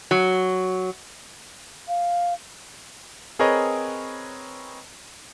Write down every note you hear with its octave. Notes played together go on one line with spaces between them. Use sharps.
F#3
F5
C4 G#4 A#4 B4 C#5 D#5